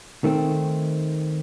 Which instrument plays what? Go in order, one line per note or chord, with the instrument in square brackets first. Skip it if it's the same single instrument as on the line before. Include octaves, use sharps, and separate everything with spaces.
[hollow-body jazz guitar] D#3 A3 C4